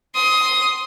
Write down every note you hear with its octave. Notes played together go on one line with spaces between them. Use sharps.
C6 D#6